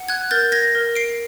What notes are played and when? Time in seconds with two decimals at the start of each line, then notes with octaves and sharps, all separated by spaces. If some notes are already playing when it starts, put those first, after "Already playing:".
Already playing: F#5
0.09 F#6 G#6
0.31 A#4 G6 A6
0.52 G#6 A#6
0.75 A#4
0.95 C7 D7